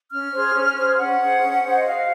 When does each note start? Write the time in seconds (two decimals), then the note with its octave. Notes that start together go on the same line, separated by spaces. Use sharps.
0.10 C#4 F6
0.32 G#4 C5
0.54 C#4
0.76 G#4 C5
0.97 C#4 F#5
1.19 G#4 C5
1.41 C#4
1.62 G#4 C5
1.74 D#5
1.85 F#4 F5